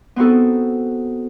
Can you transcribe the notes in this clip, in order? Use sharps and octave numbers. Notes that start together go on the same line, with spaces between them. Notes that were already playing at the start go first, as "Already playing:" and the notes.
B3 C4 D#4 F#4 A4